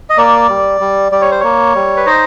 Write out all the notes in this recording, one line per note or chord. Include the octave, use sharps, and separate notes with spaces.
D#5
A#3 D5
G3
G3
G3 D5
C#5
C5
A#3 C#5
G3
B4
D#4 C5